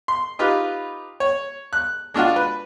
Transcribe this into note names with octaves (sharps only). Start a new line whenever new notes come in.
C6
D#4 F4 G4 B4
C#5
F#6
G#3 D4 F4 F#4
B4